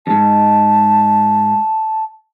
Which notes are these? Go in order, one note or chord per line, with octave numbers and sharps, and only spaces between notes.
F2 G#2 A5